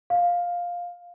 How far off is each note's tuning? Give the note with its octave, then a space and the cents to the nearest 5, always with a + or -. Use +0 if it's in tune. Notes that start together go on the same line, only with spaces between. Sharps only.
F5 +10